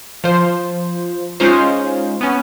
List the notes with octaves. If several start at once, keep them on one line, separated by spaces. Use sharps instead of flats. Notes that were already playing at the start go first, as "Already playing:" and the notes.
F3 C5
G#3 C#4 D#4 F4 C5
B3 C#4